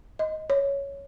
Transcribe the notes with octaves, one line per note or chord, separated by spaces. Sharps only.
D#5
C#5